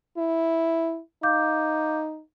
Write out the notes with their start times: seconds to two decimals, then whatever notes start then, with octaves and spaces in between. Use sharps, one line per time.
0.18 E4
1.23 D#4 F5 D6 G6